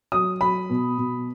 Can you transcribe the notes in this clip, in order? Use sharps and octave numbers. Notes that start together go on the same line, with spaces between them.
F#3 D#6
F#3 B5
B2
B2